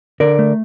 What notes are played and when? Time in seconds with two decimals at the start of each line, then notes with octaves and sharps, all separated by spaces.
0.20 D3 A#4 D5
0.39 A3